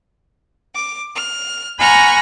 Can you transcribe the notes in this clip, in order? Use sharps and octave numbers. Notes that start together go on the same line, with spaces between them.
D6
F6
F#5 G#5 A#5 B5 C#6 F6